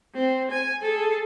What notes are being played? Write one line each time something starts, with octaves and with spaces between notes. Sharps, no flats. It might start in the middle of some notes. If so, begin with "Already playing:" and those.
C4
G#5
G#4 A4